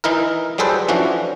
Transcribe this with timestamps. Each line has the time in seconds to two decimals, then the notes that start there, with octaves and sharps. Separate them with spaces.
0.04 E3 D#4 E4 A#4
0.58 F#3 G3 G#4 A4 B4 C5
0.89 E3 F3 C#4 D4 F#4